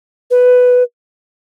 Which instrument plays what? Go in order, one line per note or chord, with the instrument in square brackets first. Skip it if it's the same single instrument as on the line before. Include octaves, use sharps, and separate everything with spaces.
[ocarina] B4